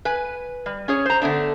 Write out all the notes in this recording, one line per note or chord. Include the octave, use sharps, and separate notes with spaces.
B4 G#5
G3
C#4 G#4 C#5
C5 A#5
D3 A3 B3 D4